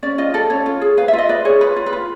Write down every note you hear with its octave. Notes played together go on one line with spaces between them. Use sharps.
C#4 D5
F4 D#5
A4 D5
C#4 C#5
F4
G#4
B4 F5
E5
F4
D#5
B4 D5
G#4 C#5
F4 B4
F4
B4
F4